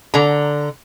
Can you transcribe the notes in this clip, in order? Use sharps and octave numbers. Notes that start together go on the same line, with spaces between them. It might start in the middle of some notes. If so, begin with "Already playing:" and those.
D3 A#5